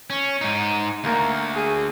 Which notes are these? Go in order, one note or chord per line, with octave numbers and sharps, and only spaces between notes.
C#4
G#2 D#4
D2 A#3
G#4